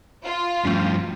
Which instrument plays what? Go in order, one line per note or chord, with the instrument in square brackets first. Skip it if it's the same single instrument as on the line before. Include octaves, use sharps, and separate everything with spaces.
[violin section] F4
[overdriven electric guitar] G2 F3 [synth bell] A3 C#4